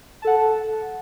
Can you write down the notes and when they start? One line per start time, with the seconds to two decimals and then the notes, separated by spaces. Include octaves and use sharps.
0.22 A5
0.25 A4
0.27 F#5